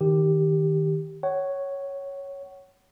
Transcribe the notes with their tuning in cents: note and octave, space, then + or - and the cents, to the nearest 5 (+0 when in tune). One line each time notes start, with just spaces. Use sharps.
D#3 +0 G4 +0
C#5 +0 F#5 +30